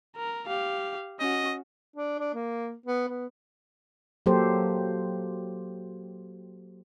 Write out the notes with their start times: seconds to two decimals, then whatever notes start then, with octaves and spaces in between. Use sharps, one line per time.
0.16 A#4
0.47 G4 F5
1.20 C#4 F#4 D#5
1.96 D4
2.19 D4
2.35 A#3
2.86 B3
3.08 B3
4.26 F#3 A#3 G4 A4 C5